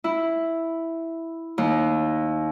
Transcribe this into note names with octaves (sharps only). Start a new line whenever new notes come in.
E4
D#2